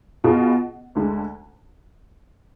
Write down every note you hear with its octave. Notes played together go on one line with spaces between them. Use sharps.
B2 B3 F4 G#4
D2 D3 G#3